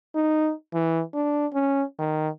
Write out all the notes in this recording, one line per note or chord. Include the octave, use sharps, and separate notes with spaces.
D#4
E3
D4
C#4
D#3